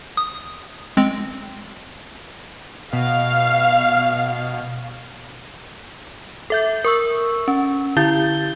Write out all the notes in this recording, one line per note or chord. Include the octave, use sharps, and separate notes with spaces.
D#6
G#3 C4
B2 F5
A4 E5 G6
A#4 C#6 E6
C#4
D3 E4 G6 A6 G7